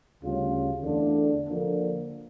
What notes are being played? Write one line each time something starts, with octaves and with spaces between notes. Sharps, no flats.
D2 C#3 G3 C#4 F4
E2 D3 A3 D4
D3 F3 A#3